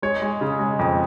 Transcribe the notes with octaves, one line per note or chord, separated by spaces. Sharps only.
G#3 C#5
G#3
C#3
G#3
F2